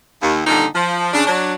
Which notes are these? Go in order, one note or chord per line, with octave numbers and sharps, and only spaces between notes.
D#2
F2 A#2 D3 D#3 G3 D#4
F3
C#3 D4
F#3 D4